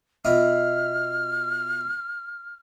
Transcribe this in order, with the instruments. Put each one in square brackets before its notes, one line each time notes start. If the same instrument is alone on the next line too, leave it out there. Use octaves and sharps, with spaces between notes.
[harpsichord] B2 E4 F4 [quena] F6